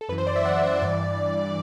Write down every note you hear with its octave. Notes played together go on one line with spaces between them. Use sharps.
A4
F#2 E3 B4
C5
D5
E5
F#5
E5
G2 E3 D5